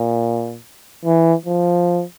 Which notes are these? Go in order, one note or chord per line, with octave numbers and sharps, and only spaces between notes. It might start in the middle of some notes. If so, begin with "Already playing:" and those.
Already playing: A#2
E3
F3